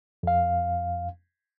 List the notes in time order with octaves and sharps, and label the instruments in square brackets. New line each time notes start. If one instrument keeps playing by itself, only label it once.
[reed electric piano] F2 F5